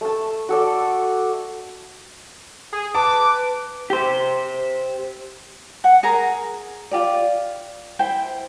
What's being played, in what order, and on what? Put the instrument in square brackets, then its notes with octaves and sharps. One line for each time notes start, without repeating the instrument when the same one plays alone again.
[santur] A3 A5
F#4 A4 D5
[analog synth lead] G#4
[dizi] B4 [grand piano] A5 [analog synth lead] D6
[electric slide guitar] G4 C5
[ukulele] F#5
G#4 A#4 A#5
F4 G4 D5
E4 C5 G5